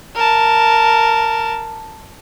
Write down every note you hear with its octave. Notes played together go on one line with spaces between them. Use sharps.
A#4 A5